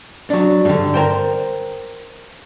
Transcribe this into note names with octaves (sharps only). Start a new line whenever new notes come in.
F#3 D4
G2 D3
A#4 C5 G5